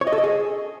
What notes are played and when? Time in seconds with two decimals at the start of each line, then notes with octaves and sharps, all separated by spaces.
0.01 C#5
0.07 D#5
0.12 A4
0.18 D#5
0.24 G#4